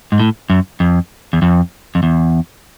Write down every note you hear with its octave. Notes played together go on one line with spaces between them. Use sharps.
G#2
A2
F#2
F2
E2
F2
F2
E2